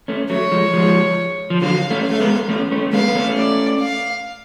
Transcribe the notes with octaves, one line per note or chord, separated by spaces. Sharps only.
A3 C#4
F#3 A3 C#5
F3 G#3
F3 G#3
F3
D3 F#3 F5
A3 C#4
F5
A3
G#3 B3
A3 C#4
A3 C#4
A3
G#3 B3 F5
B3
A3 C#4
D5
F5